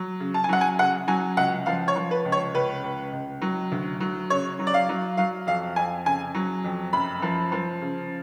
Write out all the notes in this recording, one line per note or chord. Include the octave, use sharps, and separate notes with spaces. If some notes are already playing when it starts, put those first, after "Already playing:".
Already playing: F#3
C#3
A5
G#5
F#3 F#5
G#5
C#3 F#5
F#3 G#5
C#2 F#5
F3 F5
C#5
F3
B4
C#2
C#5
C#2 B4
C#2
C#2
F#3
D2
F#3
C#3 C#5
F#3
D5
F5
F#3
F#3 F5
F2 F5
F2 G#5
C#3 G#5
F#3
F2
F#2 B5
F3
F3
C#3